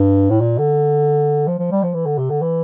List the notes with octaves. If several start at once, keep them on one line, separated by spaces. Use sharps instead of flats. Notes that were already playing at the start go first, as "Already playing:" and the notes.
Already playing: G2
A2
A#2
D3
F3
F3
G3
F3
E3
D3
C3
D3
E3